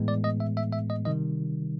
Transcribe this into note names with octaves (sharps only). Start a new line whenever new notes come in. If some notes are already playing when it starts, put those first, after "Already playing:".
Already playing: A2 E3 G#3 B3
D5
D#5
E5
E5
E5
D#5
C3 D#3 G3 D#5